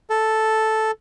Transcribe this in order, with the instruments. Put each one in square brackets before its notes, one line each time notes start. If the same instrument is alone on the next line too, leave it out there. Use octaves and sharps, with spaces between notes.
[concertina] A4